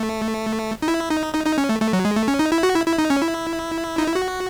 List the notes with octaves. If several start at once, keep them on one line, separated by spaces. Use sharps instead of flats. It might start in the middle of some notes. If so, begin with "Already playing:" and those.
Already playing: A3
D#4
E4
D#4
D#4
D#4
C#4
A3
A3
F#3
G#3
A3
C#4
D#4
E4
F#4
E4
E4
D#4
C#4
E4
D#4
E4
F#4